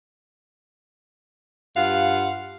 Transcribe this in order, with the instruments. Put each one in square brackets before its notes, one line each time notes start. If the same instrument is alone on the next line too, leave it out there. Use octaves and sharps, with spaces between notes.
[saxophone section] G2 F4 F5 F#5